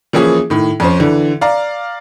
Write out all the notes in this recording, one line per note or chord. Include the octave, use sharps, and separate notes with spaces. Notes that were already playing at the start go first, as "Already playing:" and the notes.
E3 F3 A#3 C#4 E4 G#4
A2 D#3
F2 C#4 C5
D3 E3
D5 F5 A#5